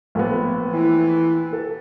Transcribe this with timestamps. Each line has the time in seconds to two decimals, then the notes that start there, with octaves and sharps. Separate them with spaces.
0.15 A#1 A3 B3
0.72 E3
1.53 A4